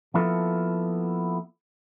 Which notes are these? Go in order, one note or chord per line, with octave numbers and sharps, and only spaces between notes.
F3 A#3 B3 E4 F4 A4